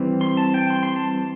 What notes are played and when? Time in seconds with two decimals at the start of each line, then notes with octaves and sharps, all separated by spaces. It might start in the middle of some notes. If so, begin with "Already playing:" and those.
Already playing: E3 G3 C4
0.21 C6
0.37 A5
0.54 G5
0.70 C6
0.83 C6
0.96 A5